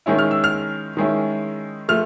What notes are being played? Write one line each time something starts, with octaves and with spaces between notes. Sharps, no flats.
D#3 G#3 C#4 E4
F6
E6
F6
D#3 G#3 C#4 E4
F3 A3 F6